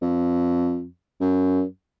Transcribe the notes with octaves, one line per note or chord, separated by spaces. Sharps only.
F2
F#2